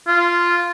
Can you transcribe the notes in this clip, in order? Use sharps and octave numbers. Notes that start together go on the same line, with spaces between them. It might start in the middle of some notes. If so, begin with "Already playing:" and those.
F4